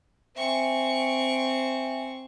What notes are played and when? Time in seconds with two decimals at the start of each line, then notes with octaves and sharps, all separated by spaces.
0.36 C4 E5 G5 G#5 C#6